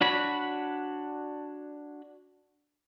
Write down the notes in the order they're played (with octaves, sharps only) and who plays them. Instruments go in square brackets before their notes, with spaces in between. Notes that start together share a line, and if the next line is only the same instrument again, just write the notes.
[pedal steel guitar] D4 F#4 C#5 B5